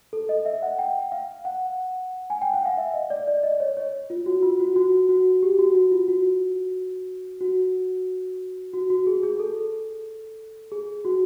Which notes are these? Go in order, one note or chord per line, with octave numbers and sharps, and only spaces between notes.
A4
D#5
E5
F#5
G5
F5
F#5
G#5
G5
F#5
F5
E5
D#5
D5
D5
D#5
C#5
C#5
F4
F#4
F4
F#4
F#4
F#4
G4
F#4
F#4
F4
F#4
F#4
F#4
F#4
G#4
G#4
A4
G#4
F#4